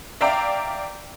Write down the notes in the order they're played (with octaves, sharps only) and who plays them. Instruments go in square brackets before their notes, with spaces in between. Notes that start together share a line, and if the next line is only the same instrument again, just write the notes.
[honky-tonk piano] D5 E5 F5 G5 A#5 D6